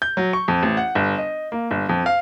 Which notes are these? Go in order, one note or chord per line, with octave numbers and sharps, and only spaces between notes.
G6
F#3
C#6
F2
A1
F#5
G1
D#5
A#3
G1
F2
F5